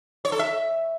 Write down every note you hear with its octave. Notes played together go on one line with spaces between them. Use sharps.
C#5
A4
E5